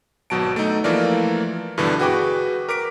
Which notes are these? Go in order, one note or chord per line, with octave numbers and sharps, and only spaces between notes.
G#1 B2 F#3 A5 D7
A3 D#4
E3 F3 A3 A#3 A#4 D5
G2 B2 D3 E3 G3 D4
F#4 G#4 B4 G5 D6
A#4 D6 B6 D7